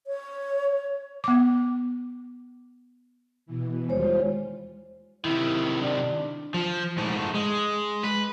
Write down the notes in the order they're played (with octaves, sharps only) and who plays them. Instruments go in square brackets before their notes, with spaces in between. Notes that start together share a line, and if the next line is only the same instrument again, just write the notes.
[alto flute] C#5
[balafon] B3 D6
[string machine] B2 E3
[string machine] D#2 G3 F4 [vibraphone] G#3 C5 C#5
[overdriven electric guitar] C3 D#3 [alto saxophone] E4
[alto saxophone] D4
[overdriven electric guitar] F3
G#2 A3
G#3
B4